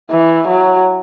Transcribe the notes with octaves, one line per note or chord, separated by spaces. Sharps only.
E3
F#3